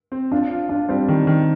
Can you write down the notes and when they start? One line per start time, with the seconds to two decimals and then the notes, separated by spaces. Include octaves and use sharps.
0.12 C4
0.31 D4 F4
0.51 F4
0.69 D4 F4
0.89 G3 C4
1.08 D#3
1.27 D#3